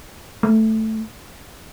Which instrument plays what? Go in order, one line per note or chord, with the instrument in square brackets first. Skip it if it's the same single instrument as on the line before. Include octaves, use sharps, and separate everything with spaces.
[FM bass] A3